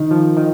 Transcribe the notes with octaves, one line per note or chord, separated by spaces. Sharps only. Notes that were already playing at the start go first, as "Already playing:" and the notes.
Already playing: D#3
F3
D#3